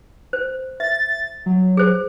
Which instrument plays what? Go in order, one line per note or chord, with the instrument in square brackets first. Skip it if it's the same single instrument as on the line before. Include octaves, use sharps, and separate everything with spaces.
[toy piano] C5
[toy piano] E5 [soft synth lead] A6
[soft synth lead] F#3
[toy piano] G#4 C5